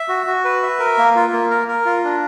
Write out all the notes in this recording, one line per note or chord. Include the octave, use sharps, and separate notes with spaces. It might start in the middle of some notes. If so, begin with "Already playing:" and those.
Already playing: E5
F#4
F#4
B4
E5
A#4
A#3
F4
A#3
A#4
A#4
F4
D4